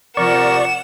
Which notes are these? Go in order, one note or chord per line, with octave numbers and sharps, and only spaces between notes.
C3 F3 A#4 D5 F#5 C#6 E7